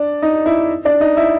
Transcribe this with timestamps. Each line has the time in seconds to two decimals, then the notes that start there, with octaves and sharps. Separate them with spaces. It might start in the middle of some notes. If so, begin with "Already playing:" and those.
Already playing: D4 D5
0.22 D#4 D#5
0.46 E4 E5
0.85 D4 D5
1.00 D#4 D#5
1.17 E4 E5